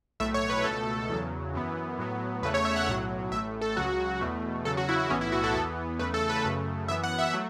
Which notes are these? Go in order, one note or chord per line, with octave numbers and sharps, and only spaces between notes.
B1 A2 A3 E5
C#5
B4
C#2 B2 A3 A4
E2 C#3 F#3
F#2 E3 B3
A2 F#3 B3
E2 C#3 A3 B4
C#5
E5
F#5
B1 A2 F#3
A1 A2 A3 E5
A4
C#2 C#3 F#3 F#4
E2 B2 A3
E2 C#3 F#3 A4
F#4
E4
E4
B1 A2 E3 B3 C#4
E4
F#4
A4
E2 E3 B3
E2 C#3 A3 B4
A4
B4
F#2 C#3 A3
F#2 E3 B3 E5
F#5
E5
F#3 A3